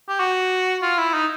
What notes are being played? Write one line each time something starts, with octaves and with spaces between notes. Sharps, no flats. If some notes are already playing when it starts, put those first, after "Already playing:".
G4
F#4
F4
E4
D#4